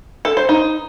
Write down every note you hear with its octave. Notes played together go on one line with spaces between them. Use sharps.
A4
C5
D#4